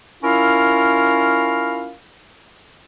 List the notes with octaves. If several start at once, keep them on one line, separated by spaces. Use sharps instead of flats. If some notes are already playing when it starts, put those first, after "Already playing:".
C#4 E4 F4 A#4 F5